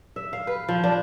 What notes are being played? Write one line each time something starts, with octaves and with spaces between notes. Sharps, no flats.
E5
F5
B4
F3
D4